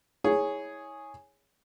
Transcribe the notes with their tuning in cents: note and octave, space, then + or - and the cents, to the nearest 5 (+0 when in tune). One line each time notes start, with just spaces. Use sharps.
E4 -35 G#4 +0 C#5 +0